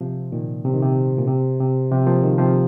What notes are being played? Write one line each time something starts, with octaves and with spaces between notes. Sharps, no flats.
C3 F3
A#2 D#3
C3
D#3
C3
A#2
C3
C3
C3 F3
F3 A#3
D#3 G#3
C3 F3